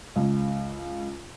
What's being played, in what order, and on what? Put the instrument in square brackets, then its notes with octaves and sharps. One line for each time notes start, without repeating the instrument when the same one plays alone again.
[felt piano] C#2